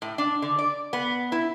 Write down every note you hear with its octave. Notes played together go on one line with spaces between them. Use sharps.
A2
D4
D3
D5
B3
E4